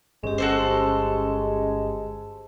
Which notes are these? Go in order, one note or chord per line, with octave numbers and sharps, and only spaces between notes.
G1 G#3 C#4 G4
F#4 A4 C5